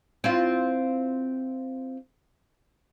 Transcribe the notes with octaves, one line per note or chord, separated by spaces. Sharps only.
C4 E4 F4